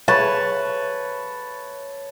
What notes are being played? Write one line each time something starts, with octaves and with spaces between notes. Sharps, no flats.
B4 C#5 A5